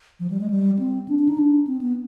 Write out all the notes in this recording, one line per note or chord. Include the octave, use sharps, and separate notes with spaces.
F3
G3
G#3
G3
C4
D4
D4
D#4
D4
C4
B3